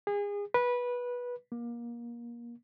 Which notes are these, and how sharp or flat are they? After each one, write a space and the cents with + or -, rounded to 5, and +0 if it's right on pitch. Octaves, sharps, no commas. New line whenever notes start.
G#4 -30
B4 -15
A#3 +25